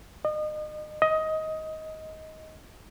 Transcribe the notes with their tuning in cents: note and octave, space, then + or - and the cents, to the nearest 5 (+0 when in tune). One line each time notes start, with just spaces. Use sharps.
D#5 -35
D#5 +15